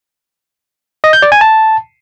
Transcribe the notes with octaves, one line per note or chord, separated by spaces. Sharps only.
D#5
G6
D5
G#5
A5